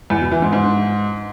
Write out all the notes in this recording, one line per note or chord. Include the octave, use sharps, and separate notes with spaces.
E2
B2
E3
G#2
G#2